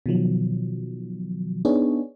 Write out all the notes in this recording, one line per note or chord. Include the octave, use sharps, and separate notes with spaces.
B2 D#3 F3 F#3
B3 D4 D#4 G#4 C#5